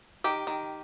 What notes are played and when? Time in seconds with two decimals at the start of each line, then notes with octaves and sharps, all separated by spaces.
0.24 D#3 G4
0.47 D#3